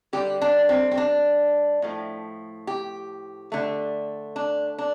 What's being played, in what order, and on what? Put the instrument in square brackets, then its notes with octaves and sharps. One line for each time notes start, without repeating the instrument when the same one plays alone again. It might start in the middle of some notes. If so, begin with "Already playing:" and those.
[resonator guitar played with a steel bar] D3 G3 G4
D4
C4
C4
D4
A2 F3 A3
G4
D3 A3
D4
D4